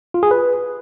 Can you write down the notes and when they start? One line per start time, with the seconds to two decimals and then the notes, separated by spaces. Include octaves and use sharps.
0.14 F4
0.23 G#4
0.31 B4